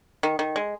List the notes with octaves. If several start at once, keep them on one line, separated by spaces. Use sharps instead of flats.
D#3
D#3
G#3